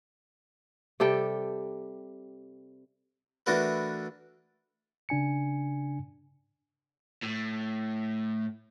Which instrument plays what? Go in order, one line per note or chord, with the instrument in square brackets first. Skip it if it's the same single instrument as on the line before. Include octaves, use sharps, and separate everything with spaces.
[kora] C3 G3 A4 G5
[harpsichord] E3 A3 D4 F#4 A#4 B4
[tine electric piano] C#3 D4 G#5 C#7
[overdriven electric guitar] A2